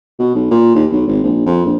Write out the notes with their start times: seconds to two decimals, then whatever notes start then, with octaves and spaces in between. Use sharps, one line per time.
0.19 B2
0.35 B1
0.51 A#2
0.75 D#2
0.92 B1
1.07 G#1
1.23 A#1
1.46 F2
1.65 A#1